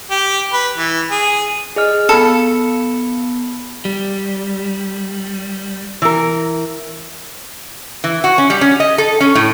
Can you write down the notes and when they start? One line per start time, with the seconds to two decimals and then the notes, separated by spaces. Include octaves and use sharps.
0.11 G4
0.53 B4
0.78 E3
1.11 G#4
1.76 G#4 D#5 F6
2.09 B3 A4 B5 C#7
3.85 G3
6.02 E3 A#4
8.04 E3
8.24 F#4
8.38 C#4
8.50 G3
8.61 C#4
8.80 D#5
8.98 A4
9.20 C#4
9.35 A2